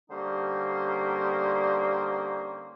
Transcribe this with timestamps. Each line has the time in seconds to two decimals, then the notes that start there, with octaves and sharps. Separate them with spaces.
0.10 D3 G3 A#3 C#4 D#4 C5